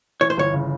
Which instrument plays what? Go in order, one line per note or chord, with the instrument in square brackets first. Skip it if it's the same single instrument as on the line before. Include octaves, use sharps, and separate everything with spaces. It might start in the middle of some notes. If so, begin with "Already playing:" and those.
[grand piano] E3 [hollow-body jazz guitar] C#5
[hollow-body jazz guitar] C5
[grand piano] G1 [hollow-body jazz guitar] C#5
[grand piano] C#3